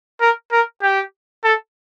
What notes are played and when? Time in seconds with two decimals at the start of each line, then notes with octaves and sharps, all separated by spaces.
0.21 A#4
0.52 A#4
0.82 G4
1.44 A4